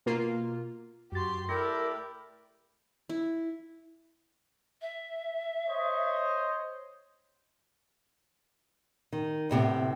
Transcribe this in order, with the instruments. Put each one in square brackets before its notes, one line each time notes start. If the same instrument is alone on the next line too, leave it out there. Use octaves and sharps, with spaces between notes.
[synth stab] B2 A#3 F4
[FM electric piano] F#2 A6 [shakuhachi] F#4 [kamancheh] G4 C6
[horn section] A3 E4 G4 [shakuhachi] A#4 [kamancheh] D5 [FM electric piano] A#6
[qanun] E4
[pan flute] E5
[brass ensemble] C5 C#5 D#5
[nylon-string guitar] D#3
D2 A2 C3 B3